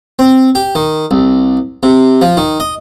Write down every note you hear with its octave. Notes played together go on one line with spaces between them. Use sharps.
C4
G4
D#3
C2
C3
F3
D#3
D#5